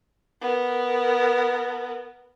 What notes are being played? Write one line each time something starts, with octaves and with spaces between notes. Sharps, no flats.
B3 A#4